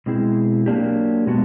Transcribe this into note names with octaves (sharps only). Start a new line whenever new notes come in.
B2 G#3 C4 E4 G#4
F#3 A#3 D4 G4
B2 G#3 B3 D4 F#4